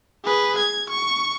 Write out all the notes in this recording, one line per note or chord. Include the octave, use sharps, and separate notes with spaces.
G#4 B4
G#6
C#6